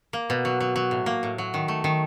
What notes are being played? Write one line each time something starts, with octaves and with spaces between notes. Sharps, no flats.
A#3
B2
F#3
F#3
F#3
A2
A#3
A2
F#3
D#3
A3
D#3